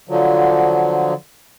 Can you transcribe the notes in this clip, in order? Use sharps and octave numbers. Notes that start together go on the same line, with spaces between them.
D3 F3 F#3